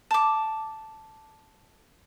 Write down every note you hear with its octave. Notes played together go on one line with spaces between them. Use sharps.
A5 D6